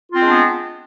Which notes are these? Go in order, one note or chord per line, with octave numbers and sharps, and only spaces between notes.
G#3 B3 C4 D4 F4